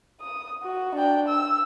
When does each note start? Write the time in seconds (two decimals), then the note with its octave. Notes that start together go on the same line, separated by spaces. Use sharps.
0.21 D#6
0.63 F#4
0.96 D4 G5
1.28 E6